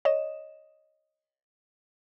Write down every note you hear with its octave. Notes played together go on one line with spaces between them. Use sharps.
C#5 D#5 E7